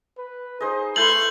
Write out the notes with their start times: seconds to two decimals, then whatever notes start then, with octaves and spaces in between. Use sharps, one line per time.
0.18 B4
0.61 D#4 G#4 C5 D#5
0.96 A3 E4 A4 B4 C6 C#6 G6 F#7